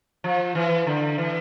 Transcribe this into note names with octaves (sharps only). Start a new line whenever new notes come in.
F3
E3
D3
E3